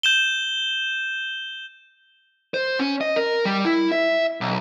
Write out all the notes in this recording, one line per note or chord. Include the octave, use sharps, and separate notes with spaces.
G6 E7 G7
C5
C#4
D#5
A#4
G3
E4
E5
B1